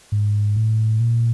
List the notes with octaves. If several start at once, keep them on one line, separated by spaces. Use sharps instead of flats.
G#2
A2
A#2